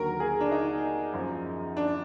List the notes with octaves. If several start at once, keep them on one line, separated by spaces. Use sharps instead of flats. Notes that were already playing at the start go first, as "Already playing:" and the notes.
Already playing: D#2 D3 F#3 A#4
G#4
D4
D#4
F#2 F3
D4